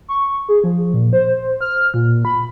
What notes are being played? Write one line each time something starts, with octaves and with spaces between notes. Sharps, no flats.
C#6
G#4
F3
A#2
C5
F6
A#2
B5